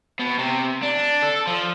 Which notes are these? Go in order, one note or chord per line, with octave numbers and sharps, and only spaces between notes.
B2
C3
D4
A4
F3